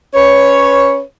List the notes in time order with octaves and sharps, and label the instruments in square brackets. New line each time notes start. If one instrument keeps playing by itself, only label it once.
[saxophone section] C#4 B4 C#5